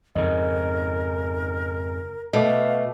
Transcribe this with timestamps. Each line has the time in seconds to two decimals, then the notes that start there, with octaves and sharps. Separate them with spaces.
0.15 F2 G#2 C#3 A#4 D#5
2.33 B2 A3 D#5 F5 D6